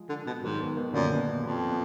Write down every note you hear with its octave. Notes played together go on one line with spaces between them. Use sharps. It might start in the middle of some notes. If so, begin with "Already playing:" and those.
Already playing: F3 G#3
D3
B2
G#2 D#3 F#3
B2 D#3
B2 D#3
F#2 A#2 D3
B2
B2
F2 B2
B2